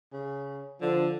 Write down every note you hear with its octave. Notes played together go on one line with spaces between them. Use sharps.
C#3
D3 F3 D4